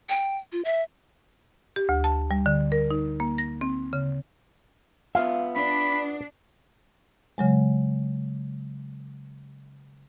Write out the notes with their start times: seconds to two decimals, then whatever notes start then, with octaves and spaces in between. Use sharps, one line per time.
0.09 G5
0.52 F4
0.65 E5
1.76 G4
1.89 D2
2.04 A5
2.31 G3
2.46 D3
2.72 A#4
2.91 D#4
3.20 A#3
3.38 A#6
3.61 C4
3.93 C#3
5.15 B3 F4 E5 F5
5.56 D4 B5
7.38 C#3 F#3 G#3